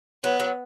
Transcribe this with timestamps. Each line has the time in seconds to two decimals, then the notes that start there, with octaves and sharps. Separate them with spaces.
0.23 F#3 B3
0.40 F#3